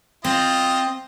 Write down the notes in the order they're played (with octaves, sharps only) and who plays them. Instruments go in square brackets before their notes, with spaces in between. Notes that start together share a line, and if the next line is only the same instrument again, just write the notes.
[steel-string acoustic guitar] C4 [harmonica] F4 D#5